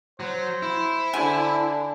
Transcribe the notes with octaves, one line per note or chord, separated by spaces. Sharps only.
F#3 C5
E4
D3 G#5